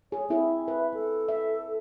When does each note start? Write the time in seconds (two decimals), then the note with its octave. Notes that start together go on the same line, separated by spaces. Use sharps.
0.12 G#4 C#5
0.30 C4 E4 G#4 E5
0.68 B4
0.94 A4
1.28 E5